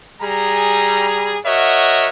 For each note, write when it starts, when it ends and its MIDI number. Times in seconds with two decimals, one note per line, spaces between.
0.21 1.37 55
0.21 1.37 68
0.21 1.37 82
1.45 2.09 66
1.45 2.09 70
1.45 2.09 73
1.45 2.09 75
1.45 2.09 76
1.45 2.09 78